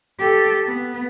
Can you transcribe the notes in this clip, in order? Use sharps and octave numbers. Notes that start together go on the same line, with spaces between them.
G4 A4
B3